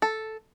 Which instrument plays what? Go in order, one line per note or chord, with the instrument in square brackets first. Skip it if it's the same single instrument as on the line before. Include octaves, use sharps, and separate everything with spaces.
[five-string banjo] A4